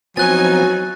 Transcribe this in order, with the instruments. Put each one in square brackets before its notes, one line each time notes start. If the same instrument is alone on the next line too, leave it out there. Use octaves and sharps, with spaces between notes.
[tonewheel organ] F3 B3 C4 [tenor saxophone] F#3 [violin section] D#4 G#5 [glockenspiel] F#6 A6